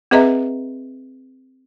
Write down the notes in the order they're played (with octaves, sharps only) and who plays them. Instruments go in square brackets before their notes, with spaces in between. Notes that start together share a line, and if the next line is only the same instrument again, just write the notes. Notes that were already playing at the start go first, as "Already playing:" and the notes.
[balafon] C4 G#4 B4 D#5 E5 A#5